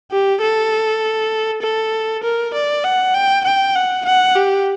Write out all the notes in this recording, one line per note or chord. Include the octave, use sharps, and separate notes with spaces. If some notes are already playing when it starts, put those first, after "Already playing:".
G4
A4
A4
A#4
D5
F#5
G5
G5
F#5
F#5
G4